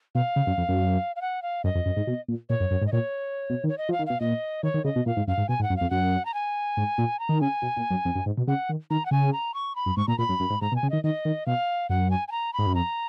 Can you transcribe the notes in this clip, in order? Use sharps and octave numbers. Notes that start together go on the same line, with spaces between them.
B2 F5
C#3
F#2
F2
F#2
F5
F#5
F5
F#2 D#5
F2
F#2
G#2
B2
A#2
A#2 C#5
F#2
F#2
G#2
D#5
A#2 C#5
B2
D#3
C#5
D#5
F3
F5
D#3
B2 F5
A#2 D#5
D#3 C#5
D#3
C#3 D#5
B2
A#2 F5
G#2
F#2 F5
G#2
B2 G#5
G#2
F#5
F#2
F2 F5
F#2 F#5
A#5
G#5
G#2
A#2
A#5
D#3
C#3 G#5
B2
A#2
F#2
F2
F#2
G#2
B2
C#3 F#5
D#3
D#3 A#5
F#5
C#3 G#5
A#5
C#6
B5
F#2
G#2 C#6
A#2 A#5
A#2 B5
F#2
F#2
G#2
G#2 A#5
B2
G#5
C#3
D#3 D#5
D#3 D#5
D#3
B2 F5
F#2 F#5
G#5
G#5
A#5
B5
G#2
F#2
F2 A#5